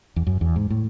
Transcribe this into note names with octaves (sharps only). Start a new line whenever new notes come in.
E2
F#2
E2
G#2
A2